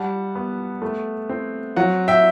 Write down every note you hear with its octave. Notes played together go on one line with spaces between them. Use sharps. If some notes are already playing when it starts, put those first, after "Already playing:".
Already playing: G3 F#5 A5
B3
A3
C4
F#3 F#5
E5 G5